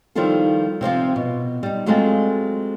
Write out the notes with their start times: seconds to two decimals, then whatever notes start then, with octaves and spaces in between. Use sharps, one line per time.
0.15 D#3 F3 G3 E4 F4 A4
0.81 C3 F3 C4 F4
1.16 B2
1.63 G3 D#4
1.86 F#3 G#3 A3 C4 F4 G#4